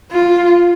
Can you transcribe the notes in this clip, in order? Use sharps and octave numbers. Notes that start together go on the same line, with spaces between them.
F4